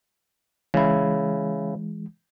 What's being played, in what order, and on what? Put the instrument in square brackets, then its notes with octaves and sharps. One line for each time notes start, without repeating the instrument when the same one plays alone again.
[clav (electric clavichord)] C#3 E4 [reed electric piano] E3 G#3